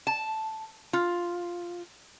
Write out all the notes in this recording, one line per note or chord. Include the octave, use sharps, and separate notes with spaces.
A5
F4